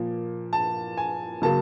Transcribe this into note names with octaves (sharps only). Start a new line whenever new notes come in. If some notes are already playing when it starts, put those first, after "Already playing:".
Already playing: A#2 F3 A#3
A5
G#5
C#3 F#3 A#3 A5